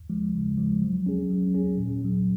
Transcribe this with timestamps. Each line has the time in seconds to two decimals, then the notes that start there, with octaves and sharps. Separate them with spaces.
0.10 F3 G#3
0.34 C#3
0.58 F3 G#3
0.82 F#3
1.06 C#4 G#4
1.30 F#3
1.54 C#4 G#4
1.77 A#2
2.01 F#3 C#4